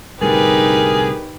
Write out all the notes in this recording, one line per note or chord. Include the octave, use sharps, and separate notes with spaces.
C2 A2 D3 D#4 G4 G#4 A#4 B4